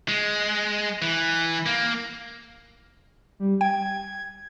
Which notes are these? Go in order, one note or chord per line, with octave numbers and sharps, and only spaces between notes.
G#3
E3
A#3
G3
G5 G#6